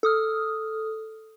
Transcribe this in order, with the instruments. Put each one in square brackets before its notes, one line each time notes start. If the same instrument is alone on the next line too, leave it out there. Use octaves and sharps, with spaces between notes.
[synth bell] A4 D#6 F6